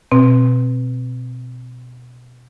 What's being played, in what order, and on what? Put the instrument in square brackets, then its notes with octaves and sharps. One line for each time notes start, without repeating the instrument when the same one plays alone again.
[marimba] B2 C4